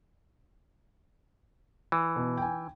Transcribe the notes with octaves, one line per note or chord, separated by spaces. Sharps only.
E3
B2
G5 G#5